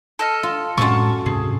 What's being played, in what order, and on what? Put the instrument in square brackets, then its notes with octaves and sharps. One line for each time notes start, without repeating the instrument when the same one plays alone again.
[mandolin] A4 D#5 F6
[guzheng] F4
[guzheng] F#2 A4 [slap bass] A2 G#3 C4 [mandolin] F4 A5 C#6
[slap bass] D2 G#2 C3 [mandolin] G#4